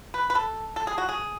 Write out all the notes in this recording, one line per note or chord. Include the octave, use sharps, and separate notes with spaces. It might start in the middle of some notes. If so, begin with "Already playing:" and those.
B4
B4
A4
A4
G#4
F#4
G#4